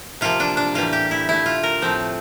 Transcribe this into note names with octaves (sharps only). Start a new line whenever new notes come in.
C3 F3 A#3 F4
D4
D4
A2 E3 G3 A#3 F4
G4
E4
D3 A3 E4
F4
A#4
A2 F3 A3 C4